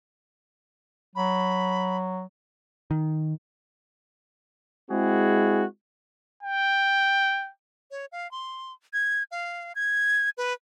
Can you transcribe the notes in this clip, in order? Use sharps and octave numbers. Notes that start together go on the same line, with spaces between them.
F#3 B5
D#3
G#3 C4 E4 F#4 G#4
G5
C#5
F5
C6
G#6
F5
G#6
B4